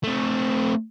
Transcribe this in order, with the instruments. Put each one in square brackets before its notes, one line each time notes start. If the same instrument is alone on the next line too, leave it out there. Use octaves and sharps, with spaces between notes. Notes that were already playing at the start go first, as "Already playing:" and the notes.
[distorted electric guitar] A3 C4